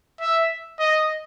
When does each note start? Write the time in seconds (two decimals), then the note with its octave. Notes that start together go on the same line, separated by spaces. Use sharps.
0.21 E5
0.79 D#5